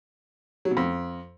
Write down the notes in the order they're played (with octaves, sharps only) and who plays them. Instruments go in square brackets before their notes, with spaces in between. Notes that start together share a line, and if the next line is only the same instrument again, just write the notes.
[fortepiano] F#3
B2
F2